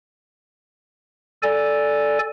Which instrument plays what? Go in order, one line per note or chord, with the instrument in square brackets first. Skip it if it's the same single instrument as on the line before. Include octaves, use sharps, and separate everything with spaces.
[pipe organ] A4 D5 G#5